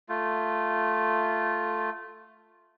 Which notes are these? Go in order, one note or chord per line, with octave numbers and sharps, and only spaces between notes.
A3 F4